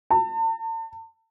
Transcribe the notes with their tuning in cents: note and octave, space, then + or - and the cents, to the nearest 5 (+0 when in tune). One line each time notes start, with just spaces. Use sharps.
A5 +40